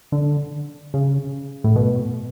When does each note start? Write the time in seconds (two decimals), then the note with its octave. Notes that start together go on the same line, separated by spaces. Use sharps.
0.12 D3
0.94 C#3
1.64 A2
1.76 B2